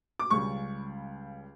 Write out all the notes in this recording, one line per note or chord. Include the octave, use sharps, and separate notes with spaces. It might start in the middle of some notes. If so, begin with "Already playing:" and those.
D6
C#2 C#3 G3 C#6